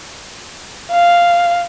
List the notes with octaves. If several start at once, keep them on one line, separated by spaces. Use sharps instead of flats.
F5